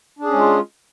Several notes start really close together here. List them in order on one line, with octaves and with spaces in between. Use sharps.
D4 G#4 C#4 G#3 F4